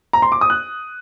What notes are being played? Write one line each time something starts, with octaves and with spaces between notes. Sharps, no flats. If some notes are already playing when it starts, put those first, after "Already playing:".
A#5
C6
D6
D#6
F#6